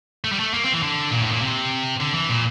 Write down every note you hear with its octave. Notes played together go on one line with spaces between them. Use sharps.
A3
G3
A3
A#3
C4
E3
D3
A#2
A2
A#2
C3
D3
E3
A#2